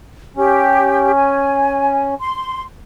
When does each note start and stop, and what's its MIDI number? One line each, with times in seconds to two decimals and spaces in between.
0.37 2.15 61
0.37 1.10 67
1.15 2.03 80
2.20 2.62 84